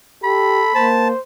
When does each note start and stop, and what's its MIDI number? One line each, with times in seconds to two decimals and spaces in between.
0.24 0.62 67
0.24 0.75 69
0.24 0.89 83
0.75 1.12 58
0.75 1.20 72
0.75 1.08 81